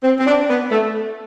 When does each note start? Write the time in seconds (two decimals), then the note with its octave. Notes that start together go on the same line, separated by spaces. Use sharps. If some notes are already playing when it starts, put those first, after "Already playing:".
0.04 C4
0.19 C4
0.27 D4
0.50 B3
0.71 A3